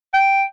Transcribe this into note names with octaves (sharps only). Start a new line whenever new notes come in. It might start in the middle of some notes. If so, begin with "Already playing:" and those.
G5